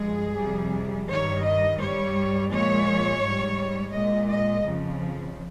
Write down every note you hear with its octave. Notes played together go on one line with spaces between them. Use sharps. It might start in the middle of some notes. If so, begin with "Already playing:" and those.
Already playing: G2 F3 G#3 G#4
F2 C3 G3
G2 D#3 G3 C#5
D#5
G2 G3 C#5
A#2 F3 G#3 C#5
G#2 G3
A#2 G#3 D#5
D#5
F2 C#3 F3